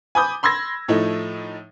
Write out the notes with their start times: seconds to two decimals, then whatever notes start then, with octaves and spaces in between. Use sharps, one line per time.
0.15 G#5 B5 D6 D#6 G6
0.43 B5 C6 E6 G#6 A#6
0.88 A2 F3 A3 D#4